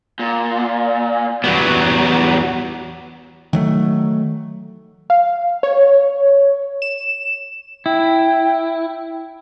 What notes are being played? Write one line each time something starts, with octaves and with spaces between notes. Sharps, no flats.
A#2
E2 F#3 G3 B3
D#3 F#3 A3
F5
C#5
E7
E4 G5